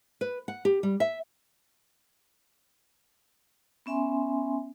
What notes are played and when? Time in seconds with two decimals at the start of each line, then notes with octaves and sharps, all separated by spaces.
0.21 B4
0.48 F#5
0.65 G4
0.83 G3
1.00 E5
3.86 B3 C#4 E5 G#5 C6